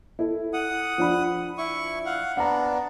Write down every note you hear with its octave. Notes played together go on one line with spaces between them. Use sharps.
E4 A4
F#5 D#6
F3 D4 B5
E4 C#6
F5 F#5
B3 D4 F#5 A#5